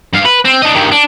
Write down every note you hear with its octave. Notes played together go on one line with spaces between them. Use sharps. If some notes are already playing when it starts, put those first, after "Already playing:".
G2 F5
B4
C4
D4 D#5
G2 D#3
D4